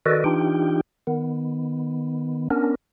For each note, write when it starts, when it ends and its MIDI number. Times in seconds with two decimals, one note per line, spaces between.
0.06 0.24 51
0.06 0.24 66
0.06 0.24 69
0.06 0.24 71
0.06 0.24 74
0.06 0.24 75
0.24 0.81 52
0.24 0.81 62
0.24 0.81 63
0.24 0.81 65
0.24 0.81 67
0.24 0.81 79
1.07 2.48 51
1.07 2.48 59
2.50 2.75 59
2.50 2.75 61
2.50 2.75 62
2.50 2.75 70